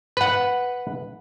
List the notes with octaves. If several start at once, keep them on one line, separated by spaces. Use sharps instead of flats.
B4 F#5